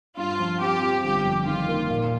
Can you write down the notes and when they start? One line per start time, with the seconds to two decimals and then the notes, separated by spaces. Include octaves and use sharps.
0.17 G2 F4
0.39 F3
0.61 C4 G4
0.82 F4
1.04 G1 G4
1.25 F2
1.47 D#3 F4
1.68 A#3
1.90 A#2